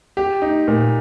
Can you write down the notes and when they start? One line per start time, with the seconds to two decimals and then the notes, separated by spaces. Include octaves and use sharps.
0.17 G4
0.42 D#4
0.68 A#2